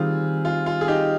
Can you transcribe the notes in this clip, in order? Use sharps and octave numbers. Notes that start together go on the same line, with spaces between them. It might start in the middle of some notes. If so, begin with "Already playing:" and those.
Already playing: D#3 G3 C4 F4 G#4
F4
F4
G#4
D#4 G4